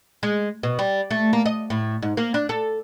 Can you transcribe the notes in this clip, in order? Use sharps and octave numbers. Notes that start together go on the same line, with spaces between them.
G#3
B2
G3
A3
A#3
D#5
A2
G#2
A#3
D4
A4